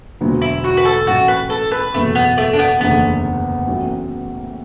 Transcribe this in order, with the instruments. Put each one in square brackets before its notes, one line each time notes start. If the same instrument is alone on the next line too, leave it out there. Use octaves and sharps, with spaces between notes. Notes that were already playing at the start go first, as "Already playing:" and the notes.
[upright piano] E1 D2 D3 F#3 B3
[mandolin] E4
F#4
B4
A4
[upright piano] A1 A2 F#3 [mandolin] F#4
[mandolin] B4
A4
B4
[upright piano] F#1 E2 B2 F#3 [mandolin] A3
[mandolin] B3
A3
D4
B3
[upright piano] F#1 E2 D3 A3 D4 [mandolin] B3
[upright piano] A1 A2 F#3